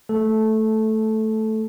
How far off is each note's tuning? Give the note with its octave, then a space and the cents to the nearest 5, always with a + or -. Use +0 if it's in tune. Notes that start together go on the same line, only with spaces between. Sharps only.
A3 +0 A4 -10